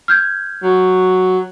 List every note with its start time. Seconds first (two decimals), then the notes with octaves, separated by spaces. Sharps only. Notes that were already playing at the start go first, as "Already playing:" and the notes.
0.08 F6 G6 G#6
0.63 F#3